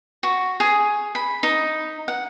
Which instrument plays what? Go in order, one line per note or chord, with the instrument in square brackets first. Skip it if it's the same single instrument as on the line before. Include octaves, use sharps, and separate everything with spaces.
[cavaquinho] F#4
G#4
B5
D#4
F#5